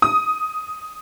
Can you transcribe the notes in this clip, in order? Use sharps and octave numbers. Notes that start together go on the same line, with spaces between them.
D#6